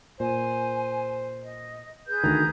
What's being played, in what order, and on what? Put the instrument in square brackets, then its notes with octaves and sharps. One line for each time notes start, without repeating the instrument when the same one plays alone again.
[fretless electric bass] A#2 [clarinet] C5 [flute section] G#5
[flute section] D#5
G#4 B4 G6
[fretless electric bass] D2 D#3 [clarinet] A#5